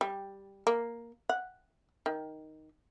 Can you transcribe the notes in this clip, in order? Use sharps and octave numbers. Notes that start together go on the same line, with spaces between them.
G3
A#3
F#5
D#3